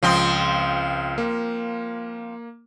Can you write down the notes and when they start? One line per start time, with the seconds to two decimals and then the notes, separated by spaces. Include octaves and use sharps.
0.03 C#2 F3 C4 D#6
1.18 A#3